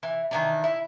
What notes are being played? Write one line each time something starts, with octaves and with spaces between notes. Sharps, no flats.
E3
D#3 E3 D4
E4